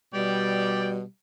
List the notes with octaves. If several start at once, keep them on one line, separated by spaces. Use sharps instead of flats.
B2 G3 D5 G5